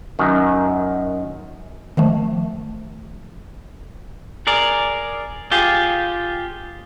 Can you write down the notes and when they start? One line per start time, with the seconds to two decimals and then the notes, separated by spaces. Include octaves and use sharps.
0.19 F#2 D#3
1.97 D#3 F3 A3
4.47 G#4 A#4 D5
5.51 F4 G4 G#4